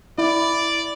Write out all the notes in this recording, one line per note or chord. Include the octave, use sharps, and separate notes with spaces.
E4 D5